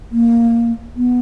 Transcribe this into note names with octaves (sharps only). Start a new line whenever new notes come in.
A#3
B3